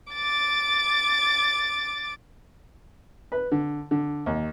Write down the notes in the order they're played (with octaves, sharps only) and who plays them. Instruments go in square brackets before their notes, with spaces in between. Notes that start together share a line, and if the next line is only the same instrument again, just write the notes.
[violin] D6 A6
[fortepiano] B4
D3
D3
D#2